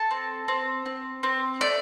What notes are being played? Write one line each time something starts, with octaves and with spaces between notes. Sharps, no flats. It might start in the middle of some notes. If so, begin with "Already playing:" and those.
Already playing: A4 A5
C4
C4
C4
C4
A3 D5